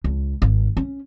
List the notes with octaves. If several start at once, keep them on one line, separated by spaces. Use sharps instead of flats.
C#2
G#1
C#4